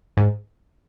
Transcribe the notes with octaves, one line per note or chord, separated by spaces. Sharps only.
G#2